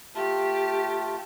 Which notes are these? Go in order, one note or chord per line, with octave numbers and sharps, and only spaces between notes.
A3 F4 G4 A5